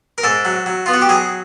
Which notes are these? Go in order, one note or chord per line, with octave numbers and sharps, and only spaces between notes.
A#4
G#2 A4
F#3
F#3
B3 F4
F#4
G4
F#3 G#4